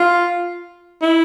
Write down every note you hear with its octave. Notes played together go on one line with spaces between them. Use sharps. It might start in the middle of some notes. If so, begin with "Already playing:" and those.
Already playing: F4
E4